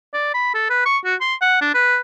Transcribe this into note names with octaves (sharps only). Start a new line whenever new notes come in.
D5
B5
A4
B4
C#6
F#4
C6
F#5
D4
B4